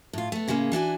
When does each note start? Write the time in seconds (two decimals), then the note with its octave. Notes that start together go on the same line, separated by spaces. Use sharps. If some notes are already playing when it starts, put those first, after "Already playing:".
0.13 A2 F4
0.32 A3 B3
0.48 A2 C#3 G3 G#3 A#3
0.72 E3 D4 F#4 G#5